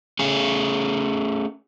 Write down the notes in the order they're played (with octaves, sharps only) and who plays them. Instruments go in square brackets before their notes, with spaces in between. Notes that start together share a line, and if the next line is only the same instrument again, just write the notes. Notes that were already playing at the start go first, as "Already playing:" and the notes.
[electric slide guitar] A3 C#4 G#4